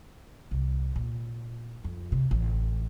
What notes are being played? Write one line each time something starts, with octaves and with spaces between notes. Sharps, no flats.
C2
A#2
F2
C3
A1